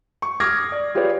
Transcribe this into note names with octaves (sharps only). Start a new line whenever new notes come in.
C#6
D6 D#6 F6 G#6 A#6 C7
D5
F4 G4 G#4 B4 C#5 D5